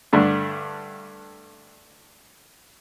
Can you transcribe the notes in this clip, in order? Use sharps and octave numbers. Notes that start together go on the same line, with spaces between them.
G2 D3 A3 D4